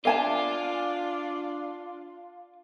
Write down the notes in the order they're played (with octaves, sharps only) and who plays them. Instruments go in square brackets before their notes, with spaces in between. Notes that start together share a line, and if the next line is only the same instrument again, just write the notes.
[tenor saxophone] D4 [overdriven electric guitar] F4 [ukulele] E5 G#5 A5